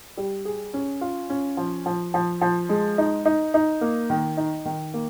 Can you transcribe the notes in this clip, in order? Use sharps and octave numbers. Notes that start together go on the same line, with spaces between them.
G3
G#4
C#4
F4
C#4
F3
F3
F3
F3
G#3
D#4
D#4
D#4
A#3
D#3
D#4
D#3
A#3